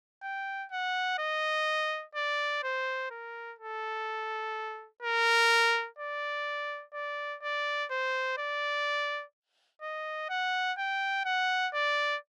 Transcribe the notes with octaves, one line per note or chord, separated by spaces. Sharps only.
G5
F#5
D#5
D5
C5
A#4
A4
A#4
D5
D5
D5
C5
D5
D#5
F#5
G5
F#5
D5